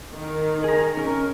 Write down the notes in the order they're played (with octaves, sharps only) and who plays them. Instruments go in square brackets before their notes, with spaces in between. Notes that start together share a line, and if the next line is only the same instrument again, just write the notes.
[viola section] D#3
[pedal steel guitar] G#4 A#5
C#4 A#4